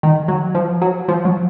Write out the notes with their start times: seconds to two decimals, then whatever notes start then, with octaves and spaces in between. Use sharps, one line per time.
0.03 D#3
0.28 F#3
0.55 F3
0.82 F#3
1.08 F3
1.25 F#3